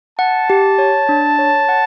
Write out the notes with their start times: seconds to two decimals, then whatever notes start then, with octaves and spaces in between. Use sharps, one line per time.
0.19 F#5 A5
0.50 G4
0.78 C#5
1.09 D4
1.39 C#5
1.69 F#5